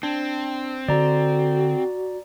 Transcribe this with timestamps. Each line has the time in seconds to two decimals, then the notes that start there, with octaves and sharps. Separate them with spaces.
0.03 C4 D4
0.88 D3 F#4 D5 A#5